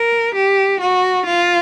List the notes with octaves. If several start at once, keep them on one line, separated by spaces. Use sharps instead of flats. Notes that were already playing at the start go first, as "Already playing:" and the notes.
Already playing: A#4
G4
F#4
F4